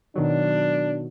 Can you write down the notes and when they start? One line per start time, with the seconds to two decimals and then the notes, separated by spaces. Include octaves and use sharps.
0.16 B2 D#3 F#3 D4